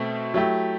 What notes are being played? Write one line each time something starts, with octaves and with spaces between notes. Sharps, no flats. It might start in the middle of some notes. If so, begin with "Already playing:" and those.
Already playing: B2 A3 C4
F#3 A3 E4 G4